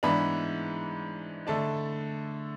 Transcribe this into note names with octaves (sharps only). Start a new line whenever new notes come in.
G#2 E3 B3 D4 B5
D3 A3 D4 A5